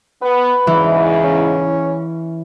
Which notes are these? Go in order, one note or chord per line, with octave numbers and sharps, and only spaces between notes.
B3 B4
E2 G#2 C#3 E3
C#4